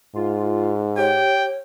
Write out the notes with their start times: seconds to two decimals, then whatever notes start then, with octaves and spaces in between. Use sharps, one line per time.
0.16 G#2 F4
0.97 G4 C#5 G5